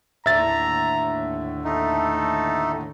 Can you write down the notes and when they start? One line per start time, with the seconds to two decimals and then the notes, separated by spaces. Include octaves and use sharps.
0.26 D#2 A2 D3 E5 A#5 A6
1.64 A3 D#4 A4